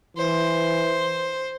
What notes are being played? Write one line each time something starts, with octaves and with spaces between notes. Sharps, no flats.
E3 C5